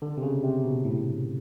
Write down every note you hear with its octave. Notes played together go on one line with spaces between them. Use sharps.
D3
C3
C#3
C3
B2
A2